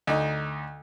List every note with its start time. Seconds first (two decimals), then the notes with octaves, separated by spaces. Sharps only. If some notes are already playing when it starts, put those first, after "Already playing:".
0.07 D2 D#4